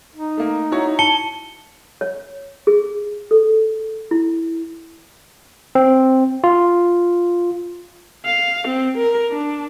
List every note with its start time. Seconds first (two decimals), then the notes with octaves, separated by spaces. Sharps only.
0.16 D#4
0.37 A3 A#3
0.72 E4 F#4 C#5
0.99 A5 C#7 G7
2.01 C#5
2.67 G#4
3.31 A4
4.11 E4
5.75 C4
6.44 F4
8.26 F5
8.67 C4
8.97 A#4
9.31 D4